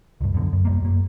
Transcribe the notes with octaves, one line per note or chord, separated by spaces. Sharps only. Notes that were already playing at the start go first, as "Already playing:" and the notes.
C#2 G2
F#2 B2 D3
F#2
F#2 G3 A#3
F#2 A#3